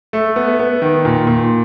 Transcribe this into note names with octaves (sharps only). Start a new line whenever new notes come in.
A3
B3
B3
D#3
A#2
A#2